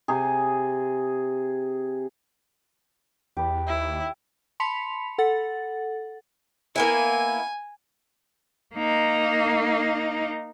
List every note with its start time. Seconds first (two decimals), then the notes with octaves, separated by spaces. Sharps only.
0.08 C3 G#4
3.37 E2 G4 B4
3.67 D#2 E4
4.60 A5 B5 C6 B6 C#7 F7
5.18 A4 F#5 A6
6.76 A#3 B3 E4 G#5
8.75 A#3 D#4